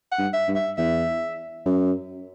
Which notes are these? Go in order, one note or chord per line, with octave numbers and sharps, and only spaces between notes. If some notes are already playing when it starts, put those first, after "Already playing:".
F#5
G2
E5
G2
E5
E2 E5
F#2